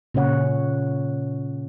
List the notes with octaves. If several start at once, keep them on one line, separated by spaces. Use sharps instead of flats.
A#2 C#3 C#4 C#5 F#5